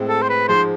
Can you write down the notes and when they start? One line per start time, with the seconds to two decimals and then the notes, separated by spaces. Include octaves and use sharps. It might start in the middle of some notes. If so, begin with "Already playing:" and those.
Already playing: A2 G#3 C4
0.09 A4
0.22 C5
0.29 B4
0.48 G#2 F3 G#3 C5